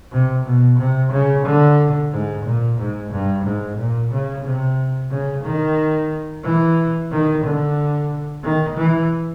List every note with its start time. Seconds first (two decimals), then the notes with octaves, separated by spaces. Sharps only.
0.12 C3
0.45 B2
0.79 C3
1.12 C#3
1.46 D3
2.11 G#2
2.45 A#2
2.78 G#2
3.12 G2
3.45 G#2
3.78 A#2
4.12 C#3
4.45 C3
5.11 C#3
5.44 D#3
6.44 E3
7.12 D#3
7.45 D3
8.44 D#3
8.78 E3